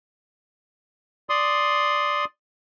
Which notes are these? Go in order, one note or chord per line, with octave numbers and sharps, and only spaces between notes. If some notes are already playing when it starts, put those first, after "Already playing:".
D5 C6 D#6